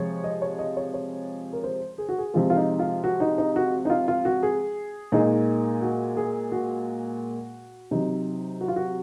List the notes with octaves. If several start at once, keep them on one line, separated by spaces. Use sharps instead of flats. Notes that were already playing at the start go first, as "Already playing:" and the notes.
Already playing: C3 F3 G#3 C#5
D#5
C#5
D#5
C#5
C#5
A#4
C5
G#4
F#4
G#4
C3 F3 G#3 F4
F4
D#4
F4
F#4
D#4
D#4
F#4
D#4
F4
F4
F#4
G#4
A#2 G#3 D#4
F#4
G#4
F#4
C3 F#3 D#4
F#4
F4
F#4